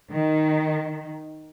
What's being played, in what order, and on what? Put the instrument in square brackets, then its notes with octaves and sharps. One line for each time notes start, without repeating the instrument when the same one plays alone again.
[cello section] D#3